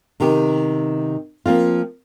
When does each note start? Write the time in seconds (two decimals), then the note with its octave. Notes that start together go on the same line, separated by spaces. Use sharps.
0.20 C3 D#3 B3 G4
1.46 F3 A#3 C4 F4